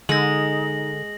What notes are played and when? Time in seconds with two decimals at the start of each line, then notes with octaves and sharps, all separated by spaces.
0.09 D3 G#3 D#4 A#6 F#7